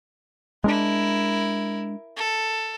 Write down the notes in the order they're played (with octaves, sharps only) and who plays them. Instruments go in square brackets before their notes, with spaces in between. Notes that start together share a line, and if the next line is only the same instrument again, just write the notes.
[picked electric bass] G#3 C#4 D4 [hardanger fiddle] E4 A#4
[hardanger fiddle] A4